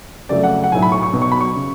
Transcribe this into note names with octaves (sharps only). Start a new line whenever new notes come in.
F2 C#3 F#3 A3 D5
F#5
F#5
B1 A2 F#3 G#5
B5
C#6
C#6
B1 B2 F#3
C#6
B5
C#6
C#3